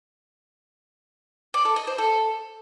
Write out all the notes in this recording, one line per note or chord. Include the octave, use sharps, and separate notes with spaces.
D5
A4
D#5
C5
A4